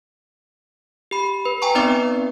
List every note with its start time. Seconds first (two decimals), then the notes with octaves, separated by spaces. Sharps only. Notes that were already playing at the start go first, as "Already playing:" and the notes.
1.11 G4 B5
1.45 B4
1.62 G5 G#5 A#5 C#6
1.75 B3 C4 D#4 B4 D5 D6